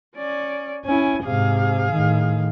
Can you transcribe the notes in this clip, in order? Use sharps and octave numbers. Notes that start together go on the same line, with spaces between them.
C#4 D5
C#4 E4 G#5
G#2 C3 G#4 F5
A2 D#3